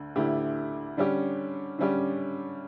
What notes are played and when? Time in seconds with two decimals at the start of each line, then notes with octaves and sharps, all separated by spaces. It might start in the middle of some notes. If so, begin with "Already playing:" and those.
Already playing: D2 D3
0.16 D2 D3 A3 E4 G4
0.97 D3 G3 C#4 G4
1.79 D3 G3 C#4 G4